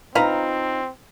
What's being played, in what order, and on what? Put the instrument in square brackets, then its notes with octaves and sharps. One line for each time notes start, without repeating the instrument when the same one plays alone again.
[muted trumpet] C4 [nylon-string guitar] D#4 F4 [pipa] B4 F5 A#5